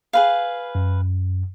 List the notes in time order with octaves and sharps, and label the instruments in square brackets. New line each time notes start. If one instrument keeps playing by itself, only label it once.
[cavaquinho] G#4 B4 F5
[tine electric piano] F#2